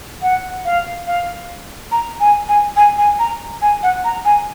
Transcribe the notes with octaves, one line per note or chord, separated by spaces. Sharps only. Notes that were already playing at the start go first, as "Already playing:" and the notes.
F#5
F5
F5
A#5
G#5
G#5
G#5
G#5
A#5
G#5
F#5
A#5
G#5